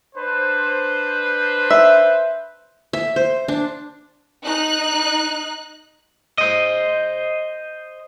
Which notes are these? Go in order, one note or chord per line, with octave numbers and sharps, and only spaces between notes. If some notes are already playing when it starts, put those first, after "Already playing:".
D4 B4 C5
E5
E5
C5
D4
D#4 F#6
C5 D#5